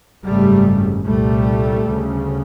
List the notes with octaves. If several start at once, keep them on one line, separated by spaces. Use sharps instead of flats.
G#1 F#2 C#3 G3 A3
C2 A#2 G3 A3
D2 C#3